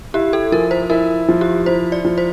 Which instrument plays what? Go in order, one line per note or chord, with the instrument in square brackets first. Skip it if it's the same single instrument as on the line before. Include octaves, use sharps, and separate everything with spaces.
[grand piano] E4 [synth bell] G4
[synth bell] A4
[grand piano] F3 [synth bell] A#4
[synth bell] C5
[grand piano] E4 [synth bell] A#4
[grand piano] F3
[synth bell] G4
[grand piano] E4 [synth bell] C5
[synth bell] D5
[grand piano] F3
[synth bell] C5